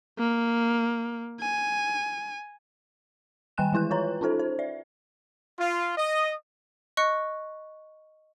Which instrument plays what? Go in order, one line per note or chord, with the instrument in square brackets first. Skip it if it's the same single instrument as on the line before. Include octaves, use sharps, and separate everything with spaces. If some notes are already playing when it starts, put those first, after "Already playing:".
[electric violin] A#3
G#5
[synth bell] D#3 G3 G5 G#5 F#6 E7
E3 G#3 E4 B4 F#6
F4 B4 C#5 A#5
C#4 D#4 F4 A4 C5
C5
D5 E5
[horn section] F4
D#5
[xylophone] D#5 C#6 F#6 C#7